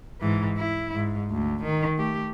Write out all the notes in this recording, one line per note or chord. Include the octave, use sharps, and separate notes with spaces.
G#2 E3
E4
G#2
D2
D#3
A3 G4